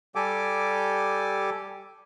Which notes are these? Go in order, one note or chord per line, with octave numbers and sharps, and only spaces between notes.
G3 G4 A4 G#5 D6